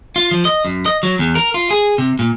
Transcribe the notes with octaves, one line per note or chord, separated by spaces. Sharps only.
F4
F3
D#5
F#2
D#5
F#3
E2
A#4
F4
G#4
C3
A#2